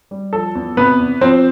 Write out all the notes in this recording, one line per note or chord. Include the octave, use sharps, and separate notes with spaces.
G3
F3 A4
E2
C3 B3 B4
E2
F3 C4 C5